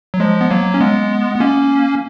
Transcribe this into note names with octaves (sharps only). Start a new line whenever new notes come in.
F#3
F3 G#3
B3
F#3 A#3
C#4
G#3 B3
B3
A#3 C#4